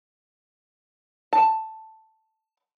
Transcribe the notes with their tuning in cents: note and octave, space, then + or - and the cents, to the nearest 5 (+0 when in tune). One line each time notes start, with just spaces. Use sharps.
A5 +5